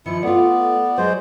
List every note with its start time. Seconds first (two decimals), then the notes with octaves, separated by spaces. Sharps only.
0.06 D#3 F3 E4 C#7
0.23 A3 B3 F4 D5
0.98 F#3 G#3 C5